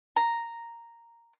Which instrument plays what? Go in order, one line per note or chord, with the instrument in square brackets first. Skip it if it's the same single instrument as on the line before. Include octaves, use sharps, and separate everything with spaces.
[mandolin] A#5